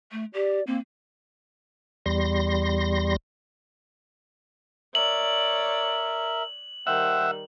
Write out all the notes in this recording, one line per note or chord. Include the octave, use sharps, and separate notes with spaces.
A3
G4 D5
A#3 C4
E2 G3 C6 A#6
A#4 C#5 D5 E5 F#7
D#3 G3 C5 E5 F#5 G5